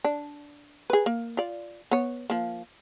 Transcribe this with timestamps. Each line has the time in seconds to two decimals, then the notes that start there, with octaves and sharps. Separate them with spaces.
0.04 D4
0.90 G#4 B4
1.06 A#3
1.37 F4 D5
1.91 B3 C#5
2.30 F3 A#3